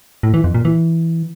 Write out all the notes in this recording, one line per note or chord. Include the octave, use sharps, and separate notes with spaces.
A2
E3
F2
A#2
E3